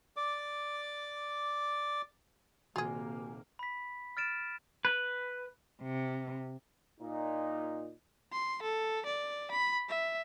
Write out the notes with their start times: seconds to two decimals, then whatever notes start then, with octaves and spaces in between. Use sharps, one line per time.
0.16 D5 D6
2.76 D#1 C3 A#3 F4 F#4 G#4 G#5
3.59 B5 B6
4.17 F6 A6 D7 E7
4.85 B4
5.82 C3
7.00 A#2 D#4
8.32 C6
8.63 A4
9.06 D5
9.51 B5
9.89 E5